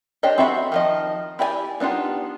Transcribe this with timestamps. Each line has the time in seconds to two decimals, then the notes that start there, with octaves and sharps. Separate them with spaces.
0.23 D4 G4 C5 C#5 D#5
0.38 C4 F#4 A4 E5 B5
0.72 D#3 F3 D#5
1.39 E4 G4 D5 D#5 G#5
1.80 B3 D4 D#4 F4 G4